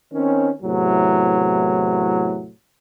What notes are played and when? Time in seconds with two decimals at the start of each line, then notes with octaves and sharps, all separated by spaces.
0.13 D#3 C4 C#4
0.62 E2 A2 C3 F#3